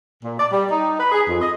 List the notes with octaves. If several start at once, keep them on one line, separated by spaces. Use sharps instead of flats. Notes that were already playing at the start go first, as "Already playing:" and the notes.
A#2
D5
G3
D#4
B4
G#4
F2
D#5